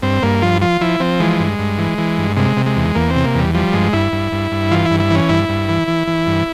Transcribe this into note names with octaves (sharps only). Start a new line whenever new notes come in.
G2 C4
G2 A#3
F3 F4
F3 F4
F3 E4
F3 C4
E3 G#3
G2
G2
E3
E3
G2
C3 G#3
C3
G#3
E2
E2 A#3
C4
C3
A#3
E2 G3
F3 G3
G2 G#3
G2 E4
G2
G2
G2
E3 F4
E4
G2
E4
E3 C#4
G2 E4
G2
E3
E3
E3
G2